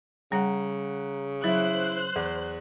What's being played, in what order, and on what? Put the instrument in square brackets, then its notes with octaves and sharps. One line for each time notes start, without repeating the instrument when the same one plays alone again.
[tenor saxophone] C#3 [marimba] G3 [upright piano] F#5 A#5
[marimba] F#3 [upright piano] E4 E5 [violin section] C5 F#6
[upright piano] E2